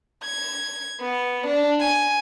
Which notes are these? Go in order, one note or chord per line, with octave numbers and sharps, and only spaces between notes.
G#6
B3
D4
G#5